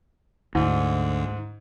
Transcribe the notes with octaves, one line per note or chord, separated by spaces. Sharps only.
D2 G#2